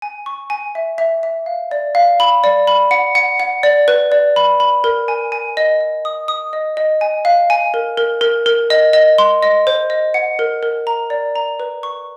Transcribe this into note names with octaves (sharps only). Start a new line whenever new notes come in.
G#5
C#6
G#5
E5
E5
E5
F5
D5
F5
B5
D5
B5
F#5
F#5
F#5
D5
B4
D5
B5
B5
A#4
G#5
G#5
D#5
D#5
D#6
D#6
D#5
D#5
G#5
F5
G#5
A#4
A#4
A#4
A#4
D#5
D#5
C6
D#5
C5
D#5
F#5
A#4
A#4
A#5
D5
A#5
B4
C#6